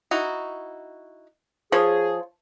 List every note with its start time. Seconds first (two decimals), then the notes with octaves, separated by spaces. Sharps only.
0.11 D#4 E4 F#4
1.72 F3 G#4 C#5